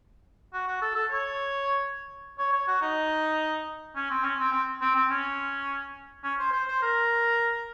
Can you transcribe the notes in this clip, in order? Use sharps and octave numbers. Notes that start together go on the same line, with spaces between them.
F#4
F#4
A4
A4
C#5
C#5
C#5
F#4
D#4
C#4
C4
C#4
C4
C4
C4
C4
C#4
C#4
C5
C5
C5
A#4